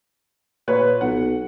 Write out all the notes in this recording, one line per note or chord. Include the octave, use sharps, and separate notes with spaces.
A#2 B4 C#5
B1 F#5